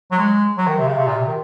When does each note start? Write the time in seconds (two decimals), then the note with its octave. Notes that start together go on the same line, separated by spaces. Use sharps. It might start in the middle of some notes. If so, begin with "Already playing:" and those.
0.11 F#3
0.18 G#3
0.57 F#3
0.67 D#3
0.78 C3
0.87 C#3
0.97 C3
1.07 A#2
1.17 C3
1.28 D#3